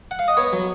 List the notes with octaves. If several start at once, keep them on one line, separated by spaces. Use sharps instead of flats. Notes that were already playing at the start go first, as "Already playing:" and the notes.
F#5
F5
D#5
B3 C#5
F#3